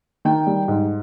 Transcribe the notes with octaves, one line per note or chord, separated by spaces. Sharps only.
D#3 G5
G3
G#2